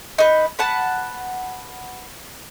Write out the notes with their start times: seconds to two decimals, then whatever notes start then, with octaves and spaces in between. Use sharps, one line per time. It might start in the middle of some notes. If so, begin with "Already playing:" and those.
0.18 D#4 B4
0.59 B4 F#5 A5